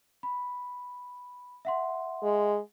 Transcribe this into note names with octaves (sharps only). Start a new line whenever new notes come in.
B5
E5 F#5 C6
G#3